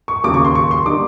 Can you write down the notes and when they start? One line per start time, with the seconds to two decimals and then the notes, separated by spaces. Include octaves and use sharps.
0.08 C#6
0.24 D#2 C#3 F#3 D6
0.34 C#6
0.45 C6
0.55 C#6
0.71 C6
0.86 D3 G3 A#3 D#4 D6